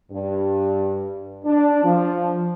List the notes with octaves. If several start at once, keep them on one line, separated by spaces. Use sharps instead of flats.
G2
D4
F3